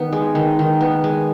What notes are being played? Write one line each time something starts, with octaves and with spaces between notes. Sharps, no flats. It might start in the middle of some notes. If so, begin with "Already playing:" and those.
Already playing: D#3 B3 B4
G#3
D#3
D#3
B3
G#3